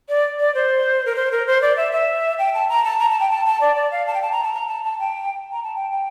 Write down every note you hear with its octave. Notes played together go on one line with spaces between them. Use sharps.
D5
D5
C5
A#4
C5
A#4
C5
D5
E5
E5
G5
A5
A#5
A5
A#5
A5
G5
A5
A5
D5
D5
F5
A5
G5
A5
A#5
A5
A#5
A5
A5
G5
A#5
A5
G5
G5